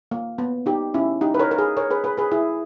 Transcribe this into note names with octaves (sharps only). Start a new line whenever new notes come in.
A#3
B3
D#4 G4
C#4 E4
D#4 G4
B4
A#4 C#5
A#4
G#4 B4
A#4 C#5
G#4 B4
G#4 B4
G#4 B4
E4 G#4